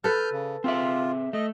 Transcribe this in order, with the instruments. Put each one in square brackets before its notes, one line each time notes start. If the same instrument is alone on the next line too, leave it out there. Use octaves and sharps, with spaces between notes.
[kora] A4 B4 [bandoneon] F6 G6
[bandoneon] C#3
[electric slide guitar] C4 G#4 E5 [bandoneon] F4
[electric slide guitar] A3 [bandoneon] D#5